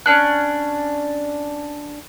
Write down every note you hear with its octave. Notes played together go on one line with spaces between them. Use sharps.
C#4 D4 F#6